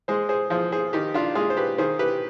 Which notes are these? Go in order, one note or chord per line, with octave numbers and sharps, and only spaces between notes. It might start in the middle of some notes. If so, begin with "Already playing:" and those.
G#3 G#4 C5
G#4 C5
F3 G#4 C5
G#4 C5
D#3 D#4 G4
D4 F4
G#3 F4 G#4
C5
G4 B4
D#3 G#4 C5
G4 B4